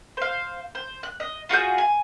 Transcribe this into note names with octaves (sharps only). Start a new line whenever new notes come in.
C5 F5
C5
F#6
D#5
F4 F#4 G#4 G6
G#5